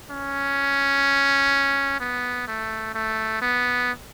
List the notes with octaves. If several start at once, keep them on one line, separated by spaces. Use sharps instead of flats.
C#4
B3
A3
A3
B3